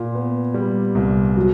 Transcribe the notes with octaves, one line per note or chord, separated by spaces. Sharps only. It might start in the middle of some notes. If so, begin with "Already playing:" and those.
Already playing: A#2
B3
G3
C2
F#3